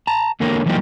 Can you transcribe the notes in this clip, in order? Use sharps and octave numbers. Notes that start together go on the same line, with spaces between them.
A5 A#5
E2 D3 A#3 A#4 C#5
E3 F#3 G3 A#3 D#4 G4